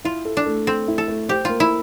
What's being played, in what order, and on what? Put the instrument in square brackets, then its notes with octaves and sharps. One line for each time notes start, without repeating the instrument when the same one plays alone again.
[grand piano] E4 [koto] F4
[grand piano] A4
[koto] D4
[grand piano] A3
[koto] C4 [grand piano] A4
[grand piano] E4
[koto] A4
[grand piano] A3
[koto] G4 [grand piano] C5
[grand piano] A#3 [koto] F4
[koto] E4